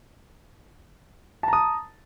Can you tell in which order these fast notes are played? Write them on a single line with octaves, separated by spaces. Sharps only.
A5 A#5 D#6